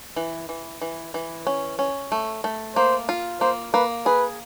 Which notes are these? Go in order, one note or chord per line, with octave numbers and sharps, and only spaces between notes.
E3
E3
E3
E3
C#4
C#4
A3
A3
A#3 C5
F4
A#3 C5
A#3 B4
G#4 B4